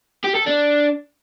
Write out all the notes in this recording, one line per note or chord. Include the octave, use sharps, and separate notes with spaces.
G4
A4
D4